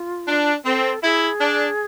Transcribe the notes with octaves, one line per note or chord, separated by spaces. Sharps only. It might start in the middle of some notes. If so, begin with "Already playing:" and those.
Already playing: F4
D4
C4 A4
E4 G#4
D4